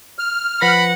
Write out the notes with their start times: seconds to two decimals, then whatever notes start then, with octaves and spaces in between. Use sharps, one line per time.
0.19 F6
0.61 F3 B4 F#5 B5 A#6